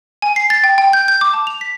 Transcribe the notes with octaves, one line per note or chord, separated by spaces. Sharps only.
G#5
C7
A6
G5
G5
G6
G6
D6
A5
F7
B6